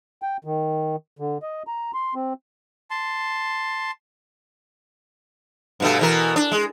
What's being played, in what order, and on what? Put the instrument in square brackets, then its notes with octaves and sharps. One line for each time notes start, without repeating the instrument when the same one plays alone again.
[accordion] G5
D#3
D3
D#5
A#5
C6
C4
[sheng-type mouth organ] A5 C6
[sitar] G2 B2 A3
B2 E3 A#4
D4
G#3